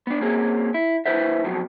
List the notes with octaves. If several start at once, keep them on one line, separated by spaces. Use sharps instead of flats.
B3 D4
A#3 C4 C#4 G#4
E4
D#2 E4 B4 C5 E5
F2 B2 F3 F#3